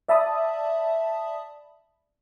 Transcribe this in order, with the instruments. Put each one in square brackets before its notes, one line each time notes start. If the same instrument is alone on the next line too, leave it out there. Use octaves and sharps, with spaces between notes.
[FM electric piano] D5 E5 A5 B5 D#6